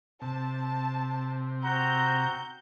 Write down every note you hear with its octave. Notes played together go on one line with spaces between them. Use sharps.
C3 A5
C4 F#4 A#5 G6